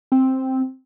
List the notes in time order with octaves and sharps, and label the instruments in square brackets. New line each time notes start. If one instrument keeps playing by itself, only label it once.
[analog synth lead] C4